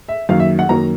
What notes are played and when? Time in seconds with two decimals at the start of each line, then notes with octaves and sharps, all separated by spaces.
0.09 E5
0.29 F#2 D#3 F#3 A#3 F5
0.40 E5
0.59 F#5
0.69 F#2 D#3 F#3 A#3 A#5